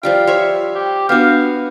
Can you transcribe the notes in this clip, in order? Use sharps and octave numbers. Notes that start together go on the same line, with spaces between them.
F3 G3 F5 G5
C5 C#5 E5
G4
B3 D4 F#4 F5 F6 G6